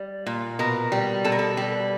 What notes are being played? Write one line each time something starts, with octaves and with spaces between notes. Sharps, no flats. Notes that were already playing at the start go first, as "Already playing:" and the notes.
Already playing: G3
A#2
B2 A#4
G3
B2 A4
A#4
A4
G3